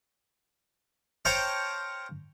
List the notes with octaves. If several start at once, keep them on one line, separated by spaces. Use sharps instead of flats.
C5 C#5 F5 G5 A5 A#5